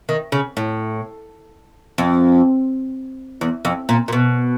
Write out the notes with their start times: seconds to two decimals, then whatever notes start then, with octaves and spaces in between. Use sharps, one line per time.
0.09 D#3
0.32 C#3
0.57 A2
1.98 F2
3.41 E2
3.65 F2
3.89 A#2
4.08 A#2
4.12 B2